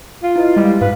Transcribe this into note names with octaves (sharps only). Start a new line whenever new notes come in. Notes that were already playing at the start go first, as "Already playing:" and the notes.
F4
E4 B4 D#5
G3 G#3
G#2 B4 F5